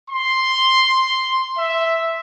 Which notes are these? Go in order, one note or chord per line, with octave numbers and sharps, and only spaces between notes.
C6
E5